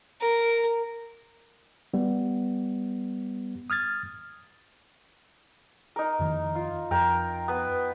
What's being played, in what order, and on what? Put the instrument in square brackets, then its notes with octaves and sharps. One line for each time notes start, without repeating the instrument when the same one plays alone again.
[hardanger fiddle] A#4
[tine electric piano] G3 B3
D#6 F6 G#6 A6
[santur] D#4 A#4
[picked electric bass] F2 D#3
[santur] F4
[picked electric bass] F2 [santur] A#4 G5
[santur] B3 B4